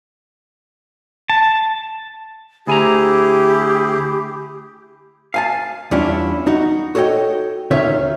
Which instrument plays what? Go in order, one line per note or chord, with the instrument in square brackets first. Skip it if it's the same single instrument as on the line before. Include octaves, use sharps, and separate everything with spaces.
[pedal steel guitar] A5
[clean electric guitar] D2 G#5 A#5 [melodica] E4 G#4 [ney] G4
[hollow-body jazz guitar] F5 G#5 A5
E2 G3 C#4 D4 E4 F4
D#4 F#4
F#4 A4 C#5 D#5 G5
D2 D#3 C#4 F4 C#5 E5